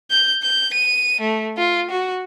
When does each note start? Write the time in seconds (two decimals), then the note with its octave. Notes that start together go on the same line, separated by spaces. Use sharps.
0.11 G6
0.43 G6
0.74 D#7
1.21 A3
1.58 F4
1.91 F#4